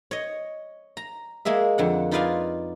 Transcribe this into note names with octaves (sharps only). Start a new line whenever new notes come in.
C#5 D#5
A#5
G#3 A#3 G#4 E5
F2 D3 F#5
D#4 F4 B4 D5 F5 G#5